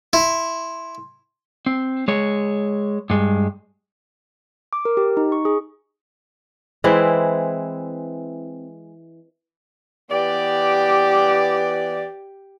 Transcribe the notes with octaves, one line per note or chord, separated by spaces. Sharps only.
E4 C6
C4
G#3 C#5
G2 G#3
D6
A#4
G4
D#4
C#6
G#4
E3 G#3 C4 E4
E3 B3 G4 D5